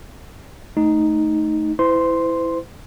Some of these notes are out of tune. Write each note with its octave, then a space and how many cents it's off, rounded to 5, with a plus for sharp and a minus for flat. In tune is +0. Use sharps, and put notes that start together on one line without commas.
A3 +0 D#4 +0
E4 +0 C5 -40 C6 +0